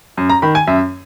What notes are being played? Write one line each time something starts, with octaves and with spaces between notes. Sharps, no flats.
F#2
A#5
D#3 B5
G#5
F#2 E5